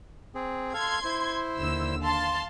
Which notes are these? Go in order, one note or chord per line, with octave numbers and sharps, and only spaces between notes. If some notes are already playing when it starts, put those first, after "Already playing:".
C4 G#4
A4 F5 C6 G#6
E4 C5
D#2 D3 E6
F5 A5 C6